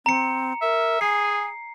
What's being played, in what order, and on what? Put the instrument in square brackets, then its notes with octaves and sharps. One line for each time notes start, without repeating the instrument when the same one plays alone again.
[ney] C4 [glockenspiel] A#5 C#7
[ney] A#4 [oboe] E5
[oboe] G#4 [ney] G#5 [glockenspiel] C7